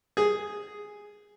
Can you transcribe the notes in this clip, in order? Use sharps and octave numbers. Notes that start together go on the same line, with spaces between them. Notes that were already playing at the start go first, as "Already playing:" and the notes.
G#4